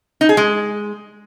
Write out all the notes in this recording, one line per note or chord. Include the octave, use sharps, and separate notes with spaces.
D#4
G#4
G#3